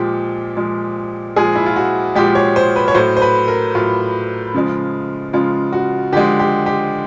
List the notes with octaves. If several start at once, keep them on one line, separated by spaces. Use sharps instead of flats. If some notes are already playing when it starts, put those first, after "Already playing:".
Already playing: A#2 F3 G#3 G4
A#2 F3 G#3
A#2 F3 G#3 G#4
E4
F4
F#4
A#2 F3 G#3 G4
C#5
C5
B4
C#5
A2 F#3 C5
C5
B4
A#4
A2 F#3 F4
C#3 F3 G#3
C#3 F3 G#3 F4
F#4
D3 F3 G#3 G4
G4
G4